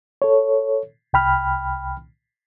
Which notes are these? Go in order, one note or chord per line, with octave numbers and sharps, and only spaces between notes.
A4 C#5
C2 G5 B5 F6